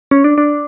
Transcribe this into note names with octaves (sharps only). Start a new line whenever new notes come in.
C#4
D4
D4